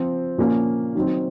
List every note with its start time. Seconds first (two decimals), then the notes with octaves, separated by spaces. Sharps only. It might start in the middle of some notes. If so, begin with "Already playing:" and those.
Already playing: F3 C4 F4
0.38 A#2 F3 A#3 C#4
0.95 D#3 F#3 C4